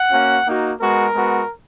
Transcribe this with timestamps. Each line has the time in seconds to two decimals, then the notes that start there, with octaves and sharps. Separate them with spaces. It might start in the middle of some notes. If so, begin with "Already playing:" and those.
Already playing: F#5
0.11 A#3 C#4 F#4
0.46 A#3 D#4 F#4
0.80 G#3 B3 F#4 A#4
1.14 G#3 B3 F#4